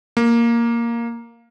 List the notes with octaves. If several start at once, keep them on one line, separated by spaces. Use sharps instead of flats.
A#3